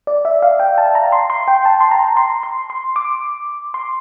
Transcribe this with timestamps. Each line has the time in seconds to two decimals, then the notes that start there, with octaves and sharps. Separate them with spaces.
0.07 D5
0.25 E5
0.42 F5
0.60 G5
0.78 A5
0.95 A#5
1.12 C6
1.30 C6
1.48 G5
1.65 A5
1.80 C6
1.91 A#5
2.17 C6
2.43 C6
2.70 C6
2.96 D6
3.74 C6